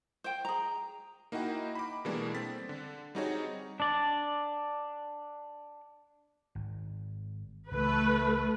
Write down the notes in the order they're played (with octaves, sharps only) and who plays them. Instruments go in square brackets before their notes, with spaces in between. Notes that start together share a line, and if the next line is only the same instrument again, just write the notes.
[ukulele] C5 G5
G#4 A#5
[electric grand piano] A#3 D#4 E4 F#4 F#5 G5
B5 D6
B2 E3 G3 G#3 A#3 D4
C4 A4 A6 B6
D3
G3 C4 D#4 F#4 G#4 C#5
[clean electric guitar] D4 D5
[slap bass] G#1
[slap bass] C#2 E3 [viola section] A3 B4